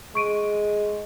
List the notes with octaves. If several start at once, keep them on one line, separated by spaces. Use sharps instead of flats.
G#3 C#6 D7 D#7